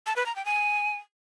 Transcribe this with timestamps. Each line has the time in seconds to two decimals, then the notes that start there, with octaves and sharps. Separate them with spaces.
0.06 A5
0.16 B4
0.26 A#5
0.36 G5
0.46 G#5